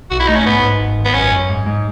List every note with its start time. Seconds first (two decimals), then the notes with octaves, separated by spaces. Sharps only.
0.11 B1 F#4
0.20 E4
0.28 A3 D#4
0.36 C#4
0.45 G#2 B3
0.62 G#2
0.79 G#1
0.98 G#1
1.05 B3
1.14 F#2 C#4
1.31 F#2
1.50 G#2
1.66 G#2